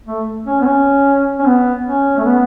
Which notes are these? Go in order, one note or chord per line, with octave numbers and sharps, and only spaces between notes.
A3
C#4
B3
C#4
C#4
B3
C#4
A3
B3